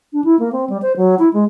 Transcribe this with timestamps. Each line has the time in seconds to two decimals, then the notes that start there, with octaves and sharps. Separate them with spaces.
0.13 D4
0.24 E4
0.39 A#3
0.52 C4
0.70 G3
0.82 C5
0.97 F#3
1.19 E4
1.33 G#3